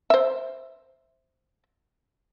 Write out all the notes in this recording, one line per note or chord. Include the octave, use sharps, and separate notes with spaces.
C5 E5